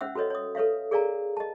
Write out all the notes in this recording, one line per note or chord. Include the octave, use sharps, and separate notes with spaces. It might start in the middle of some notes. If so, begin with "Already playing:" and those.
C#4 C5 E5 F#5 E6
F#4 A4 B4 C#5 D#5
C#5 D#6
A4 B4 C#5 E5 F5
G#4 A#4 D5 F5 G#5 A#5
D#5 A5